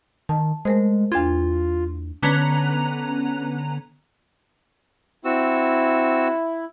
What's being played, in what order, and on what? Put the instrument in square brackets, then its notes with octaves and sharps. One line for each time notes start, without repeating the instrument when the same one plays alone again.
[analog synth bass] D#3 [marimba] A5
[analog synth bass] G#3 [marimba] A3 A#4 C5
[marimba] E2 D4 G#6 [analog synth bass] F4
[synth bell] D3 B3 C#4 A#5 F#6 F7
[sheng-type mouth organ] C4 F#4 E6 [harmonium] E4